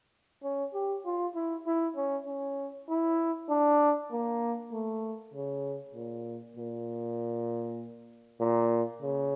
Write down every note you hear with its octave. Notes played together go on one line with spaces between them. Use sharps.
C#4
G4
F4
E4
E4
C#4
C#4
E4
D4
A#3
A3
C#3
A#2
A#2
A#2
C#3